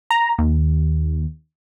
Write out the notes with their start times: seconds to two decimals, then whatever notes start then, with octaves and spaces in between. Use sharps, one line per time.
0.11 A#5
0.38 D#2